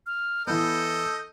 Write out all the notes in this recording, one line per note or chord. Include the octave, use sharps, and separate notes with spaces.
F6
E3 B3 A4 D#5 G6